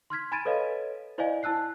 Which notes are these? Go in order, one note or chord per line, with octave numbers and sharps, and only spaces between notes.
C6 F6 G#6 B6
G#5 B5 G#6 A6 D7 D#7
A4 B4 C#5 D#5 F5
E4 C5 D5 D#5 F5 G#5
E4 A5 E6 F#6 C7